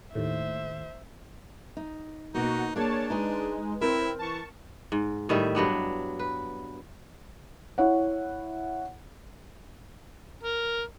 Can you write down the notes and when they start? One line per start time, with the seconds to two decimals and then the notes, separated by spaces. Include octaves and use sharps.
0.15 D#2 A2 C5 E5
1.77 D#4
2.34 B2 A#3 D#4 F#4
2.76 A#3 D4 G#4 C#5 A5
3.10 G#3 D#4 B4 G#5
3.81 C4 E4 A#4
4.19 E3 A5 C#6
4.92 G#2
5.29 A2 D#3 G3 E5
5.55 G2 F#3 B3 D4
6.19 B4
7.78 E4 C#5 F#5
10.43 A#4